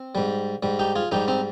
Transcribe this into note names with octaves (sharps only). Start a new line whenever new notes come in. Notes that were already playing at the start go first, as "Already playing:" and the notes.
Already playing: C4
G#2 G3
G#2 G3
D#4 G4
F4 G#4
G#2 G3 D#4 G4
C4 D#4